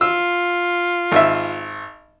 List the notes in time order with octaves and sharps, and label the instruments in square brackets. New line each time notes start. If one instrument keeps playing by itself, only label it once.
[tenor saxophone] F4 [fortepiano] E6
[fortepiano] G#1 E5